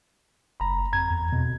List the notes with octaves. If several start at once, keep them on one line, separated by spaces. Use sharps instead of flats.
F#1 A#5 B5
F2 A#5 G#6
E2
F2 B2